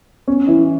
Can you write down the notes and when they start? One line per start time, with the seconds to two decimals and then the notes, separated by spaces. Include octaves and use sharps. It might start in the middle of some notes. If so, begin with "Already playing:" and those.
0.28 C#4
0.47 E3 E4